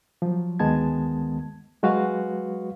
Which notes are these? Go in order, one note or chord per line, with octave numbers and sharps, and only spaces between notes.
F3 F#3
D2 D#3 G#3 B3 A5 G#6
F#3 G#3 F#4 B4 F5